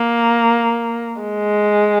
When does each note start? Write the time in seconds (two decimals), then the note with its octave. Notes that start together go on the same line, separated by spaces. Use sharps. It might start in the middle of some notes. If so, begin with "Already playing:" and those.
Already playing: A#3
1.21 G#3